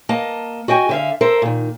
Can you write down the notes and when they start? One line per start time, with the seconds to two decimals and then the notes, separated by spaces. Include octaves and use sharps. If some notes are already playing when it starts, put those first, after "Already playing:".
0.09 A#3 D#5 A5
0.68 F#4 D#5 G5 G#5
0.89 D3 E5 F5
1.21 A4 A#4 C5 E5
1.42 A#2 D#3